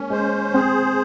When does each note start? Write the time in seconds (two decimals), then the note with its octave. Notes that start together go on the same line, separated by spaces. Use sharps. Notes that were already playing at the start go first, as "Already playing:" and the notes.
Already playing: G#3 A#3 C#4
0.10 G#3 C5
0.54 C4 G#4